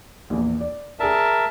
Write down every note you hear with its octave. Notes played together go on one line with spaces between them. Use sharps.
A#1 E2
D5
G#4 A#4 D5 E5 A5